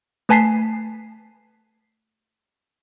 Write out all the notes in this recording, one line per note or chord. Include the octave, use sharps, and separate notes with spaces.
A3 B4 G#5 A5 B6 C7